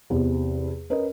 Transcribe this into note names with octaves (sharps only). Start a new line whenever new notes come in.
E2 C3
C#4 A#4 B4 D#5